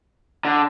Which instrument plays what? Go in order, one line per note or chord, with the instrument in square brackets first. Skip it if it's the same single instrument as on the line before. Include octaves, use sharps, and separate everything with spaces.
[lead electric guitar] D3